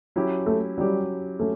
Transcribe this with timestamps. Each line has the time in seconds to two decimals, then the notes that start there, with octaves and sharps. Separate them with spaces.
0.16 F#3 C#4 E4 G4
0.46 A3
0.77 F#3 G3 C#4 E4 G4
1.39 F#3 A3 C#4